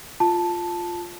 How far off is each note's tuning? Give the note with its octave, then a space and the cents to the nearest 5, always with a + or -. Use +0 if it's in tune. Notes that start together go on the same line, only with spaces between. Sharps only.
F4 +0 A5 +0